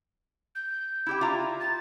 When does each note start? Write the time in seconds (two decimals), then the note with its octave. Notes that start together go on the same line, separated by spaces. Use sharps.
0.55 G6
1.07 E4 G4 G5
1.21 F4 E5 A#5
1.60 A6